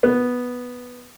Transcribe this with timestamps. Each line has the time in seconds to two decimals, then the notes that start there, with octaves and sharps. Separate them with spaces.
0.03 B3